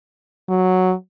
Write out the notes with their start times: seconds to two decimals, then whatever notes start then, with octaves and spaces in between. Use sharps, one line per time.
0.49 F#3